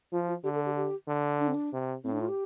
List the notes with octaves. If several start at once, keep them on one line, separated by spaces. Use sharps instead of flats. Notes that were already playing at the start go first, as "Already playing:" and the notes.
F3 F4
F4
D3 G4
A4
G4
G4
D3
D4
C4
D4
C3
A2 C4
D4
F4
G4